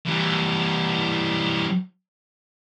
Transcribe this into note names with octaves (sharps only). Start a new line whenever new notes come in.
E3 G3